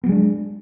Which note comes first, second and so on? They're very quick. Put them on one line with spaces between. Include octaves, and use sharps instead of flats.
B3 F#3 G#3 D4